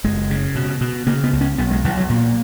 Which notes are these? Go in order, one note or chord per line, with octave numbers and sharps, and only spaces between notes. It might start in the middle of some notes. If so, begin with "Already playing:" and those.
F#1 G#3
C#3
B2
B2
C#3 A#3
B3
C#2
C#4
B1 B3
G#3
B1 E3
F#3
A#2 A#3